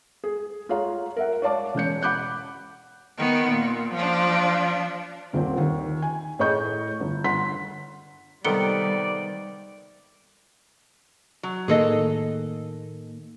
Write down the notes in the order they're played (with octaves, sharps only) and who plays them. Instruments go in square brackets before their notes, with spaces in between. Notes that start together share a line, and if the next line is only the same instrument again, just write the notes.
[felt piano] G#4
F4 G#4 C#5 F5 F#5 A#5
A#4 E5 F#5
C#5 D5 F5 A5 D6
E1 C#4 G6 C#7
F#5 B5 D6 F#6 G6
[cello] D#3 B3
A#2
F3 D4
[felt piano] D#1 A#2 C4
D#2
G#5
A2 G#4 C#5 D#5 C#6 G6
G1
G1 F#5 C6 B6
[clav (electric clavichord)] C3 D#3 B3 [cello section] G3 [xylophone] A4 C#7 G7 [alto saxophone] D5
[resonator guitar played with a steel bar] F#3
[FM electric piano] A2 D#3 A#3 [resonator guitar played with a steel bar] G#4 A4 D#5